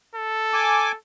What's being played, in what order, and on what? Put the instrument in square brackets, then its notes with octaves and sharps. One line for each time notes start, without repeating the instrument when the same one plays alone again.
[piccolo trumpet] A4
[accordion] G#5 D6